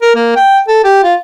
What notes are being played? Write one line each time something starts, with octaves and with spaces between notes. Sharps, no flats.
A#4
A#3
G5
A4
G4
F4